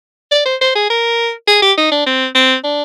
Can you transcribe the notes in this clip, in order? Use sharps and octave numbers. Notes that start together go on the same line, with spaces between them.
D5
C5
C5
G#4
A#4
G#4
G4
D#4
D4
C4
C4
D4